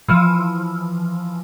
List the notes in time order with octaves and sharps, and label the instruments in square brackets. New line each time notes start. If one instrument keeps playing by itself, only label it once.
[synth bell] E3 F3